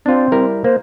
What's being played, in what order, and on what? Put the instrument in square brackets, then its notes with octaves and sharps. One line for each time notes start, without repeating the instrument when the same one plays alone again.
[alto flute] C4 [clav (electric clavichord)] D4 F4
[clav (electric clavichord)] G3 E4 A#4
[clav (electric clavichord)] A#3 [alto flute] C5